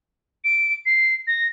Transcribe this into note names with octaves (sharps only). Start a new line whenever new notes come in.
D7
C7
A#6